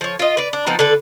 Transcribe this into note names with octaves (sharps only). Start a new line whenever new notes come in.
F3 C#5
F4 D#5
B4 D5
D4
F3 B3 C4 D#4
D3 A4 B4